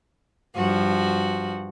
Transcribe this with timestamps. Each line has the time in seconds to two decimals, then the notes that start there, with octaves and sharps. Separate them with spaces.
0.55 G2 F3 F#4